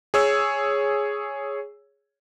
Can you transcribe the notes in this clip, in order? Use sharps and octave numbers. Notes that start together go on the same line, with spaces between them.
G#4 C#5 E6